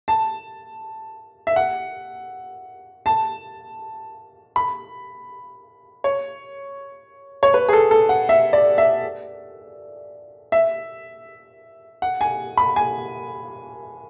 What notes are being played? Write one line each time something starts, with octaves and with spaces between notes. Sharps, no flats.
A5
E5
F#5
A5
B5
C#5
C#5
B4
G#4
A4
A4
F#5
E5
D5
E5
E5
F#5
G#5
B5
G#5